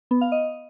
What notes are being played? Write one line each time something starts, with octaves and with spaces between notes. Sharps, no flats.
B3
F5
D#5